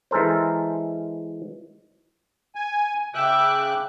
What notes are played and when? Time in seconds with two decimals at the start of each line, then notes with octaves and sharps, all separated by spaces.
0.11 E3 G#3 A4 A#4 C5
2.55 G#5
3.15 C#3 E5 G5 D6 F#6